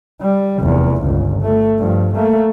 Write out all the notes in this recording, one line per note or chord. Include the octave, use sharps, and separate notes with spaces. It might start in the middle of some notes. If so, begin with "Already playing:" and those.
G3
F1 E2
G1 C#2
A3
G2 F3
A3 A#3